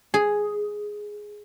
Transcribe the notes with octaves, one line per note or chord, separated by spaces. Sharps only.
G#4